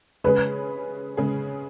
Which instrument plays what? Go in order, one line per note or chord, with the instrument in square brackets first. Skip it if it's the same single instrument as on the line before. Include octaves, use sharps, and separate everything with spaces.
[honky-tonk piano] C#3 G#3 C#4 G#4 [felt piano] B4
[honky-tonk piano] C#3 G#3 C#4 G#4